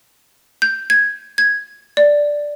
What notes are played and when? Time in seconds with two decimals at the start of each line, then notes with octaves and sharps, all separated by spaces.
0.62 G6
0.90 G#6
1.38 G#6
1.97 D5